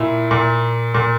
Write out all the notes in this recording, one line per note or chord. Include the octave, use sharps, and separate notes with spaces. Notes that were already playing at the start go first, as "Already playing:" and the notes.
Already playing: A#2 E4
A#2
A#2